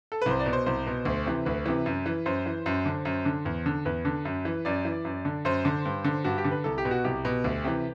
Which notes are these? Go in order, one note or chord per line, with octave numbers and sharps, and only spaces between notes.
A4
C2 B4
C5
D5
B2
C5
C2 C5
B2
D2
C3 E3
D2 B4
C3 E3
F#2
E3
F#2 C5
E3
F#2
D3
F#2
D3
E2
D3
E2 B4
D3
F#2
E3
F#2 D5
E3
F#2
D3
F#2 C5
D3
G2
D3
G2 F#4
G4
D3
B4
C2 A4
G4
B2
F#4
C2 G4
B2
D2
C3 E3